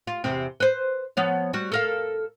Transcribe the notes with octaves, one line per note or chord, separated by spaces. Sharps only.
F4
E2 C3 C4
B4 C5
F3 B3 C#5
G3 F#4
A4 A#4 F5